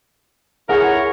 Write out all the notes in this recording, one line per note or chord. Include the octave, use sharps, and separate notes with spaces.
E4 G#4 A#4 C#5 F#5